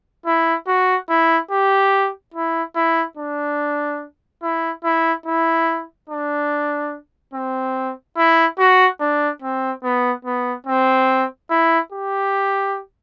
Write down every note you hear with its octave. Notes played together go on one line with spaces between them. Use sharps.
E4
F#4
E4
G4
E4
E4
D4
E4
E4
E4
D4
C4
E4
F#4
D4
C4
B3
B3
C4
E4
G4